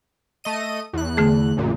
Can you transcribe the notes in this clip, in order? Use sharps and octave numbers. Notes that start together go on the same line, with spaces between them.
A3 D#5 D#7
E2 F#6
D3 A3 G#4
A#1 F#2 A#2